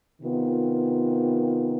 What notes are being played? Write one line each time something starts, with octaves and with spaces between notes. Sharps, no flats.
C3 D#3 B3 F4